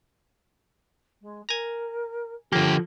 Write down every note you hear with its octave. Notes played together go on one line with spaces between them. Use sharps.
G#3
A#4 G#5 A#5
D3 F3 A#3 G4 A4